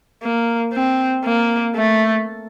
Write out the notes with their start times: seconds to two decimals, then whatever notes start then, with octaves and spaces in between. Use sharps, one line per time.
0.23 A#3
0.73 C4
1.25 A#3
1.76 A3